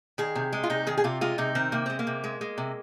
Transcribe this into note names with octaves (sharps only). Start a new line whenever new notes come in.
D#3 G#4
C3
G#3
F4
C3 D#4
D#3 G#4
G#4
C3 F4
G#3 F4
C3 D#4
D#3 C4
C3 A#3
G#3 C4
A#3
C3
G#3
G#3
C3